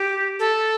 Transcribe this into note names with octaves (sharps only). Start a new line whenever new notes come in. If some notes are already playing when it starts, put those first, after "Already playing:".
Already playing: G4
A4